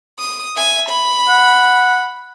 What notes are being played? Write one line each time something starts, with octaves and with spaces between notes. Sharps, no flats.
D#6
E5 G#5
B5
F#5